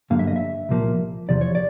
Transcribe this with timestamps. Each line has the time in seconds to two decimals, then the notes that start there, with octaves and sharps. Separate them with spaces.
0.10 G2 D3 F#3 A#3 F5
0.19 E5
0.27 D#5
0.36 E5
0.69 C2 A#2 F3 A#3
1.29 E2 C3 F3 D5
1.41 C#5
1.55 D5